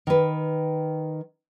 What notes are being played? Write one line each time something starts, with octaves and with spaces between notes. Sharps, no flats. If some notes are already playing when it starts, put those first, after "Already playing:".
D#3 B4